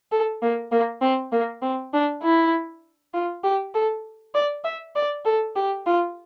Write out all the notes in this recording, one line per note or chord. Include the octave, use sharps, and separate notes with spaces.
A4
A#3
A#3
C4
A#3
C4
D4
E4
F4
G4
A4
D5
E5
D5
A4
G4
F4